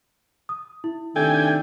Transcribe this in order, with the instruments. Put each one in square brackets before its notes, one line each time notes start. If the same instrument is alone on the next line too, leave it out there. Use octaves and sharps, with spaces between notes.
[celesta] D#6
E4
[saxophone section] C3 A3 D4 [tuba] D#3 [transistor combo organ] G5 G#5